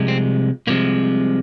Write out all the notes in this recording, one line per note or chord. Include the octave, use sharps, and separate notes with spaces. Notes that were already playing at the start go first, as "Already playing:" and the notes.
Already playing: C2 C3 F3 G#3
C4
C2 C3 F3 G#3 A#3